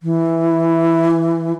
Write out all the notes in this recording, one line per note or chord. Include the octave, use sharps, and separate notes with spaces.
E3